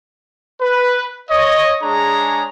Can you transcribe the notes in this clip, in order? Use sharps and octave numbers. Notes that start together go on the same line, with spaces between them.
B4
C#5 D#5
G#3 D4 G#4 C#5 A#5